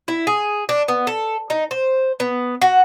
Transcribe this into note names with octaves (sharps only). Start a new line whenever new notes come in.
E4
G#4
D4
B3
A4
D#4
C5
B3
F#4